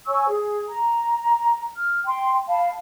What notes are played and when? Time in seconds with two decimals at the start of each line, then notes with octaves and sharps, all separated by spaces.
0.07 C#5 G#5 C#6 E6
0.29 G#4
0.69 A#5
1.77 F6
2.06 G5 C6
2.49 F5 A5 B5